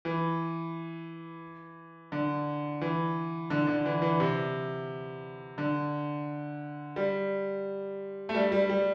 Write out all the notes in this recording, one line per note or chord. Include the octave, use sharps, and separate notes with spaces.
E3
D3
E3
D3
D3
E3
E3
C3
D3
G3
A3
G3
G3
G3